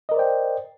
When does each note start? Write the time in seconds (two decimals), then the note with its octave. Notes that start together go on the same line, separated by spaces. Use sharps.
0.09 D#5
0.11 A#4
0.14 D5
0.17 C5
0.19 G5